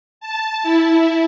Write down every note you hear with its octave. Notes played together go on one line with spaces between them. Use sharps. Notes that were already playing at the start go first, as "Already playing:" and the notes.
A5
E4